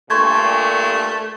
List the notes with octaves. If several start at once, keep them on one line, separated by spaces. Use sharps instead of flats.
G2 A#2 A3 C6 C#6 G#6